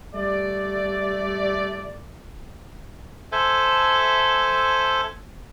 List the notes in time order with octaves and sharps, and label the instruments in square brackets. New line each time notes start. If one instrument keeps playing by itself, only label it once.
[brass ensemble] G3 A3 D5
[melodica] A4 C5 E5 G#5